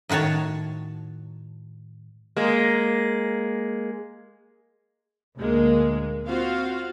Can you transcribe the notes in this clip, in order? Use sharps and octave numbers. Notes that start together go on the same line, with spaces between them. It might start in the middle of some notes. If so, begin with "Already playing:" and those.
A2 D#3 F#4 C#5 A5
G#3 A#3
D2 A#2 G#3 A#3
C4 F4 F#4 C5 F5